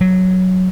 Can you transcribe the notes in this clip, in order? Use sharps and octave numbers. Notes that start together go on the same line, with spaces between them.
F#3